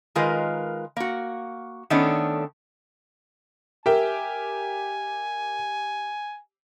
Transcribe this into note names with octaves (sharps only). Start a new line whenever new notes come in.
D#3 G#3 F4 A#4 B4
A#3 F#4
D#3 A3 B3 C#4 D4
G4 A#4 E5 G5 G#5